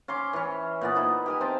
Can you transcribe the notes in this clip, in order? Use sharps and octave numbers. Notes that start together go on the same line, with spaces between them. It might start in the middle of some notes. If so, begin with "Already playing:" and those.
C#4 C6 D6
E3 C#4
A#2 B3 D5
D#4 E4 B4
G4 A#4 G#5
C4 G5 A5